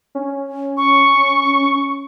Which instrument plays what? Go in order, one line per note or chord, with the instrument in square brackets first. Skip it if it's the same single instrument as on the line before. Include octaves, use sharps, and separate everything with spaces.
[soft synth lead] C#4
[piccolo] C#6